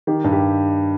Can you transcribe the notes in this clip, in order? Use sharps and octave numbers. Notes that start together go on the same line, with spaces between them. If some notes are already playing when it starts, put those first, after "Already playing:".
D#3 G4
G2
G4